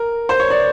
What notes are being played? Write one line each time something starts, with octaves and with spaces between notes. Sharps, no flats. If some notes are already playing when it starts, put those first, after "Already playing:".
Already playing: A#4
C5
C#5
D5